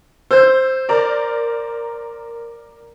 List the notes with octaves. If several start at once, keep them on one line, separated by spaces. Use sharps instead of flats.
C5 E6 G6
A#4 D5 A#5